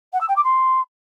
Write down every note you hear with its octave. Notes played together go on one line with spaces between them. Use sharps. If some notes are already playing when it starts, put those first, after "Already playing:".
F#5
E6
G5
D6
C6